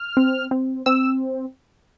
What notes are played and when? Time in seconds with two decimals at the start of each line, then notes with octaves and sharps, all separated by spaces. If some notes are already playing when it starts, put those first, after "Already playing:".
Already playing: F6
0.17 C4
0.51 C4
0.86 C4 E6